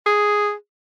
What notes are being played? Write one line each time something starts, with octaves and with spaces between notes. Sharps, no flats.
G#4